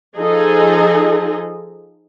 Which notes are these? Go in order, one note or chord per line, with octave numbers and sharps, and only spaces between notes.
F3 D#4 G#4 A4 D#5